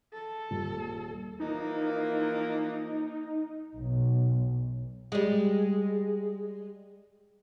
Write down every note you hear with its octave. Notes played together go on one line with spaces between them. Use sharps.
A4
D#1
E3 F3 A#3 D#4
B1
G3 G#3